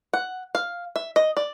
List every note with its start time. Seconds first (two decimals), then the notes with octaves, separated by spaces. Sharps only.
0.13 F#5
0.55 F5
0.96 E5
1.16 D#5
1.37 D5